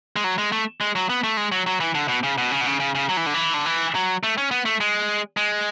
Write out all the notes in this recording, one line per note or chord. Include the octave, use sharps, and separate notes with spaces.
G#3
F#3
G#3
A3
G#3
F#3
B3
A3
G#3
F#3
F#3
E3
D3
B2
C#3
B2
C#3
B2
C#3
C#3
C#3
F#3
E3
D3
E3
D3
E3
F#3
A3
C#4
B3
A3
G#3
G#3